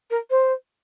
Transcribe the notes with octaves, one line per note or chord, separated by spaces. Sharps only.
A#4
C5